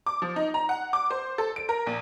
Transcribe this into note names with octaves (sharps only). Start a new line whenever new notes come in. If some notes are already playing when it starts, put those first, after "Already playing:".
D6
F3
D#4
A#5
F#5
D6
C5
A4
D7
A#4
A#1